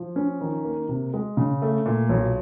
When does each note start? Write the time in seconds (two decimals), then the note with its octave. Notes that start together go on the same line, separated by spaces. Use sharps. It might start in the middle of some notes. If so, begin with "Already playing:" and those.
Already playing: F3
0.16 C#4
0.41 D#3
0.65 A#3
0.89 C3
1.14 G#3
1.37 C#3
1.62 A3
1.86 A#2
2.09 B1